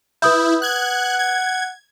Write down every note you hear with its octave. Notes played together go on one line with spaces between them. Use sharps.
E4 B4 D#6 G6
F#5 F#6 G#6
G#6